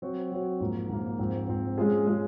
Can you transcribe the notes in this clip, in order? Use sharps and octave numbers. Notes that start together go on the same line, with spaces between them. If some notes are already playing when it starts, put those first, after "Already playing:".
F#3 C4 F#4 C#5
F#3 C4 F#4 C#5
G#2 F3 A#3
G#2 F3 A#3
G#2 F3 C4
G#2 F3 C4
G#3 C#4 F4 G#4
G#3 C#4 F4 G#4